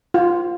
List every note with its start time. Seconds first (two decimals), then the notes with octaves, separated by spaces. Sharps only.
0.14 F4